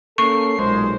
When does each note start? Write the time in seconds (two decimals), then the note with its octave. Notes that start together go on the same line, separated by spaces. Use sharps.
0.18 A#3 C#4 A4 C#6 C7
0.59 B1 A#2 G#3 C5